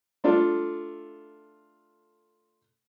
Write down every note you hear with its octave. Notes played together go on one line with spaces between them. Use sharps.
A3 D4 F4 A4